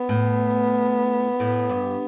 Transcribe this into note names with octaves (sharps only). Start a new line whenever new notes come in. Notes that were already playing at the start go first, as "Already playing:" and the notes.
Already playing: B3
A2
A2
G2